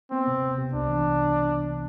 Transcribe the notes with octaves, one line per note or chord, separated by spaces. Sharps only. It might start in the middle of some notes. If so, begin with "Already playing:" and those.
B3 C4
C3
C3
C3
C2 D4
E3
C3